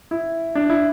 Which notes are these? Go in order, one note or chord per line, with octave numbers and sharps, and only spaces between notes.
E4
D4
E4